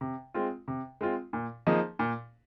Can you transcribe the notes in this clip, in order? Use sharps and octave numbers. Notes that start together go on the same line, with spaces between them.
C3
G#3 C4 F4
C3
G#3 C4 F4
A#2
F3 A#3 D#4 G#4
A#2